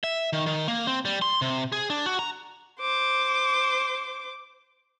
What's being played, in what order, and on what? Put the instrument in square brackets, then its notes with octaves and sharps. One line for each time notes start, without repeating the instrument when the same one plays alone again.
[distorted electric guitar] E5
D#3
D#3
A#3
C4
G3
C6
C3
G#4
D4
F#4
A#5
[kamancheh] C5 D6